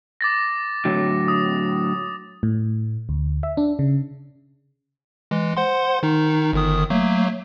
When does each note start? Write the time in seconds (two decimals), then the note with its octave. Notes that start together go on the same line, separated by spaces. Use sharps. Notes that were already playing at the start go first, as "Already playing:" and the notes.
0.21 D6 A6 A#6
0.85 A2 D3 F#3
1.28 D#6
2.43 A2
3.09 D2
3.43 E5
3.57 D4
3.79 C#3
5.31 E3 G#3
5.57 C5 F#5 C6
6.03 D#3 D#4
6.53 G1 D#3 D#6
6.90 F#3 A3 A#3